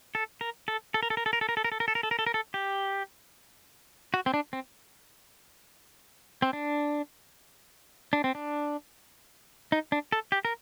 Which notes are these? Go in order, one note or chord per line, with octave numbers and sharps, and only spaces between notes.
A4
A#4
A4
A4
A#4
A4
A#4
A4
A#4
A4
A#4
A4
A#4
A4
A#4
A4
A#4
A4
A#4
A4
A#4
A4
G4
F#4
C4
D4
C4
C4
D4
D4
C4
D4
D#4
D4
A4
G4
A#4